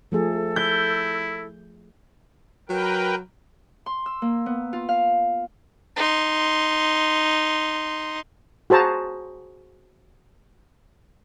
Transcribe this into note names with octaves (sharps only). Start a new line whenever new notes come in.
F3 A3 G#4 A4
E4 G6
F#3 A#4 B4 G5
C6
E6
A#3
B3
F4
F5
D#4 C6
F#4 G#4 C5 A5 A#5